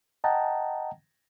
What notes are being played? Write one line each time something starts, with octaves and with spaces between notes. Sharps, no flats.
D#5 F#5 G5 A5 A#5